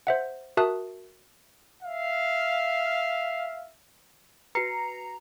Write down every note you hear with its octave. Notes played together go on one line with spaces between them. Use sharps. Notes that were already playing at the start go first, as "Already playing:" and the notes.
C5 E5 F#5
F#4 A#4 E5 A5 D#6 F#6
E5 F5
F#4 B4 A#5 C7 C#7